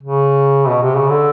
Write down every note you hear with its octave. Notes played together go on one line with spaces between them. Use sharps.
C#3
B2
C3
C#3
D3